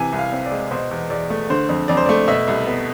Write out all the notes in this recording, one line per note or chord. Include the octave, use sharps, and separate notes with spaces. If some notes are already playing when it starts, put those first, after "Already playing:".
Already playing: C3 E3 G#5
C2
F5
C4
D5
G#3
B2 C5
E2
E2 D5
A3
D3 C5
F2
F2 D5
C5
A3 D5
B2 E5
C2
B3